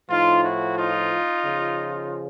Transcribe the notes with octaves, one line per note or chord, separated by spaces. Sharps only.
A2 F3 D#4 F4
E4 F#4
D#4 F4
C#3 F3